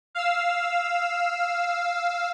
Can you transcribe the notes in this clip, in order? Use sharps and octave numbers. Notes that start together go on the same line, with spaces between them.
F5 E6